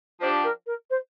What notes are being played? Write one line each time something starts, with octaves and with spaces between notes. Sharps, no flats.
F3 D4 G4 C5
A#4
A#4
C5